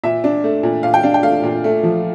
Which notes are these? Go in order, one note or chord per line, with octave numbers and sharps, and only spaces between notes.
A#2 E5
D4
A3
A#2
A#2 F5
G5
D4 F5
G5
A3 F5
A#2
A3
F3